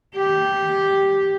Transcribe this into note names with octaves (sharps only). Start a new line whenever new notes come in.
G4